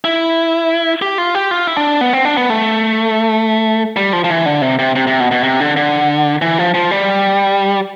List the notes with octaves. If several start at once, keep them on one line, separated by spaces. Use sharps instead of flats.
E4
G4
F4
G4
F4
E4
D4
B3
C4
D4
B3
A3
G3
F3
F3
E3
D3
C3
C3
C3
C3
B2
B2
C3
D3
D3
E3
F3
F3
G3